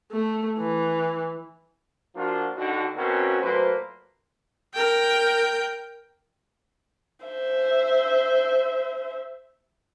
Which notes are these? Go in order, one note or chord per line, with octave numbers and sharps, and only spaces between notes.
A3
E3
F3 A#3 D4 F4 F#4
D#2 D3 F#4
B2 A#3 C4 C#4 F#4
A#2 F#3 A3 A#3 B4 C5
A#4 G5
C5 E5